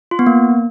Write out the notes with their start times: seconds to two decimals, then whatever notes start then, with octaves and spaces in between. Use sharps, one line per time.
0.11 F4
0.19 B3
0.27 A#3